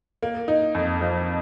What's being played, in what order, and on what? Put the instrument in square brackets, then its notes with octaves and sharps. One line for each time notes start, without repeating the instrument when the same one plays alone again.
[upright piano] A#3
D#4
F2
F3